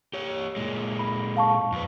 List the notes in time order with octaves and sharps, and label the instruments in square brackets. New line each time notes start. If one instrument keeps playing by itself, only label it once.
[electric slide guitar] G4 C#5
A#2 G#3
[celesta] B5
F5 A5 C#6
[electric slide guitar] F2 B4